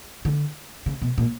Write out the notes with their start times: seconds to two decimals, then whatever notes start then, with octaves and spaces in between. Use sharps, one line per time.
0.25 D3
0.86 C#3
1.02 B2
1.18 A#2